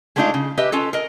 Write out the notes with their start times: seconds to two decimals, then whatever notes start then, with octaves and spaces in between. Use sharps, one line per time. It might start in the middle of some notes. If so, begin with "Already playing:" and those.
0.16 G#3 A3 B3 D4 D#4 F4
0.34 C#3
0.57 G4 B4 D#5 E5
0.72 C#4 F4 A4
0.93 A#4 D#5